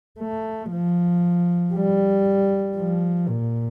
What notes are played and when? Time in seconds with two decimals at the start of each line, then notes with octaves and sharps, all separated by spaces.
0.20 A3
0.71 F3
1.74 G3
2.77 F3
3.28 A#2